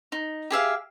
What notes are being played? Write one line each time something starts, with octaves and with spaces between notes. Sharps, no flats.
D#4
G4 G#4 E5 F5